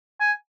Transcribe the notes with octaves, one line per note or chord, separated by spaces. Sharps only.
G#5